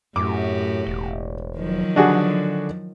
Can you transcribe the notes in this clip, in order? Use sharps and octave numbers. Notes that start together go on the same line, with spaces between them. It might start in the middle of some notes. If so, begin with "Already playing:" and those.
F#2 A2 F#4 G4 D6
E1
D#3 F3 F#3
D3 D4 F#4 G#4